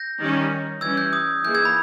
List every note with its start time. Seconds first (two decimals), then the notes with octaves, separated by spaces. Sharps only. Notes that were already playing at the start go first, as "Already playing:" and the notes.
Already playing: G6 A#6
0.19 D#3 G3 C#4
0.81 E3 G3 C#4 E6 G#6
0.97 G6
1.13 D#6
1.43 E3 A#3 D#4 G#4 G6
1.54 E6 G#6
1.65 B5